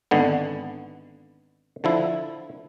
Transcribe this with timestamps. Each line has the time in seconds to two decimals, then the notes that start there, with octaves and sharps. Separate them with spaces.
0.11 G#1 D3 B3
1.84 D3 F3 E4